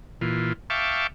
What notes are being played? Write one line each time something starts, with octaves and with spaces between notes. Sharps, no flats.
A#2 E3 F4
E5 F5 G5 A5 C#6 D6